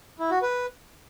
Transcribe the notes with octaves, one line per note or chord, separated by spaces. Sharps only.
E4
F#4
B4